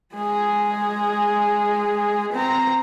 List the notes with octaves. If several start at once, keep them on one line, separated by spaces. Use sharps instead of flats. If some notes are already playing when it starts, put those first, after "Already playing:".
G#3 G#4
C4 A#5